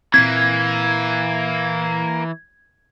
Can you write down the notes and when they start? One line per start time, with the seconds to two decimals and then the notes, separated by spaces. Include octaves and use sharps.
0.14 A#2 E3 A#3 C4 G#6